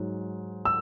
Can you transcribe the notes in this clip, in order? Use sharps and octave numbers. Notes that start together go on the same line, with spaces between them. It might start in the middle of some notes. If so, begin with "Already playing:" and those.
Already playing: G#2 F#3
E6